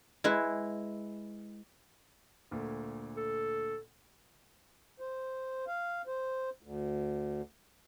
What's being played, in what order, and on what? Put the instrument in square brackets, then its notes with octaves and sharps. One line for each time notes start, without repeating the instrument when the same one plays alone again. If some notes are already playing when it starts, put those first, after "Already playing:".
[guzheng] G#3 E4 B4
[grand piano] D2 A#2 A3
[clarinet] A4
[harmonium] C5
F5
C5
D2